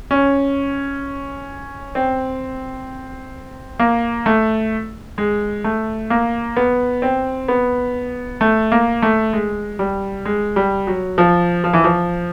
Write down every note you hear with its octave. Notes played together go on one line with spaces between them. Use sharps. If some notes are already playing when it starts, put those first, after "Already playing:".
C#4
C4
A#3
A3
G#3
A3
A#3
B3
C4
B3
A3
A#3
A3
G#3
G3
G#3
G3
F#3
F3
F3
E3
F3